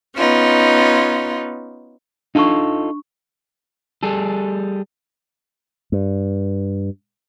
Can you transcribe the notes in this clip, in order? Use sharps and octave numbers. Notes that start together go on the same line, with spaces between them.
B3 C#4 D#4 F4
D4 D#4 F4 A4 C#6
G3 G#4 A4
G2